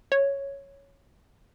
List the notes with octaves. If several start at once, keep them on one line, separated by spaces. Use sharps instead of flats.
C#5